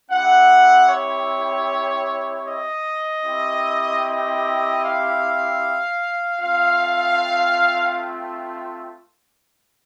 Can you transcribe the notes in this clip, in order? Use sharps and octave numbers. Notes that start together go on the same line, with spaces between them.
C4 E4 G4 F#5
C#5
D#5
C4 E4 G4
D#5
F5
A3 C4 F4 F5